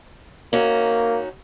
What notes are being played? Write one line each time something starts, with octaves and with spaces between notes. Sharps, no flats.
A#3 C#4 D#4 F#4